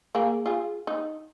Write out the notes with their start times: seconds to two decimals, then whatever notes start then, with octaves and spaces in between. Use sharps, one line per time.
0.15 A#3 G#4
0.46 F4 G#4
0.87 D#4